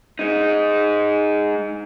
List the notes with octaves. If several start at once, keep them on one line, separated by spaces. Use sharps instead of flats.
G#3 D#4